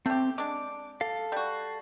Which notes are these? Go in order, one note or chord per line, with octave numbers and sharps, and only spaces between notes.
A3 C4 G4
G#3 D4 D6
A4 F5
G3 F#4